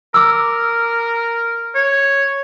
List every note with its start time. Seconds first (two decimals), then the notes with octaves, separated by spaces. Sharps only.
0.14 A#4 D6 E6
1.75 C#5